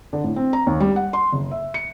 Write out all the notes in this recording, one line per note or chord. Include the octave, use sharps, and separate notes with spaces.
D3
A2
C4
A#5
D#2
G3
F#5
C6
F#1
E5
C#7